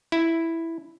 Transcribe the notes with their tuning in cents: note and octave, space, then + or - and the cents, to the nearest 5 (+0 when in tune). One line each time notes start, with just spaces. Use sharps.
E4 +0